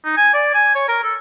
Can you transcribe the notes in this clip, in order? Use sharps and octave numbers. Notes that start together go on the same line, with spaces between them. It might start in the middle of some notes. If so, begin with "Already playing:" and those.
D#4
G#5
D5
G#5
C#5
A#4
A4